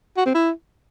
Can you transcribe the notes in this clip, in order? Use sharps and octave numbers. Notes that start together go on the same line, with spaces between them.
F#4
C4
E4